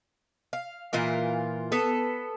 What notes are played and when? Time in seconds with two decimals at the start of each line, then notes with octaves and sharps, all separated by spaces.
0.53 F5
0.93 A#2 E3 F4 A#4
1.72 B3 A4